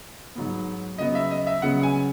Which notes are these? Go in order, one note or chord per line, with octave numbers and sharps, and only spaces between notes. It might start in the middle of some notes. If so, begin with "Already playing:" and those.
G#2 F#3 B3
C#3 F#3 B3 D#5
E5
D#5
E5
C#3 F#3 B3 F#5
G#5